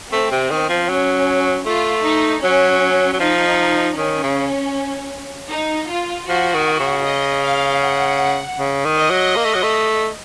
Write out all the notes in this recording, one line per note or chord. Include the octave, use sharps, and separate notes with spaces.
A3 C4
C3
D#3
F3
F#3 C#4
A3 F4
D#4
F#3 C#4
F#3
F3 D#4
D#3 C#4
C#3
D#4
F4
F3 F#4
D#3
C#3
D#5
F5
F#5
C#3
D#3
D#5
F#3
A#3
A3
F#3
A3